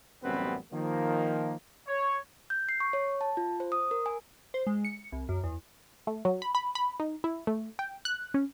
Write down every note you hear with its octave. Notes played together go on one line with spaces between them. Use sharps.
A1 F#2 G3 B3 C4 B4
D#3 F3 A#3
C#5
G6
C7
C#6
C#5
A5
F4
C5
D#6
A#4
G#5
C5
G#3
C#7
C2
F#2
E2
A3
F#3
B5
B5
B5
D#4
E4
A3
G5
F#6
C#4